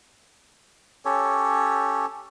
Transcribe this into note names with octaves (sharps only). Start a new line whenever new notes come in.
C#4 G4 A4 C#5